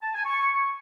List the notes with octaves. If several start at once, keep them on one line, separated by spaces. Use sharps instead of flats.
A5
G#5
C#6